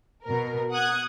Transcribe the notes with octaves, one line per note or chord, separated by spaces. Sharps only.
B2 A#4
F#5 D#6 F#6 G#6